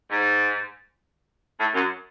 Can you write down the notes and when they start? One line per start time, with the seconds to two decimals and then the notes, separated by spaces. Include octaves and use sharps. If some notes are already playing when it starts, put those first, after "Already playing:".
0.11 G#2
1.60 A2
1.75 F#2